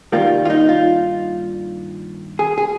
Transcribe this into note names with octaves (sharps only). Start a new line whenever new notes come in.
G2 D#3 G3 A#3 F4
F4
D#4
F4
G#4
G#4